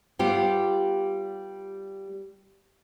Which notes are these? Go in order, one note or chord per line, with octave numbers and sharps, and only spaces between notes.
G3 B3 F4 G4